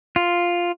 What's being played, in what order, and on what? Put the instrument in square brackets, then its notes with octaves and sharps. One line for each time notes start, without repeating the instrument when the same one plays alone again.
[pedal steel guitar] F4